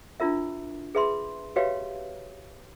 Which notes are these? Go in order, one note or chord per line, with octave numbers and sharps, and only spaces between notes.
D4 E4 F4 A#4 E5
G#4 B4 E5 B5 C6
F#4 G4 B4 C#5 E5 F5